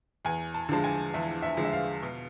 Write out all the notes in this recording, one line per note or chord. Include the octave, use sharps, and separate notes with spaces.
E2 G#5
A5
D3 F3 G#3 A5
G#5
E2 E5
E5
D3 F3 G#3
E5
F5
B2